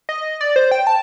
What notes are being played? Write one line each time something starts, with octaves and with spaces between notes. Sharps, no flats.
D#5
D5
C5
G5
A5